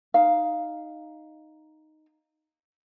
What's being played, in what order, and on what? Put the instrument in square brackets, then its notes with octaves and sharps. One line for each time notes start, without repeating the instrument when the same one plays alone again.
[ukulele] D#4 F5